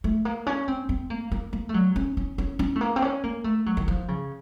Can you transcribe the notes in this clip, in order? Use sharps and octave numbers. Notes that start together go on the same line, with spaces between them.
A3
A#3
C#4
C4
C4
A#3
A#3
A#3
A3
F#3
C#4
C#4
C#4
C#4
A3
A#3
C4
C#4
A#3
A3
F#3
D#3
F3
C#3